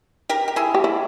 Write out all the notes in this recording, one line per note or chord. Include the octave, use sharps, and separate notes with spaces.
G4 A#4
G4
E4 G#4
G4
E4